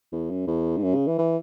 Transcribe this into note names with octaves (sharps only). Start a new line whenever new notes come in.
E2
F#2
E2
G#2
F#2
C#3
E3
E3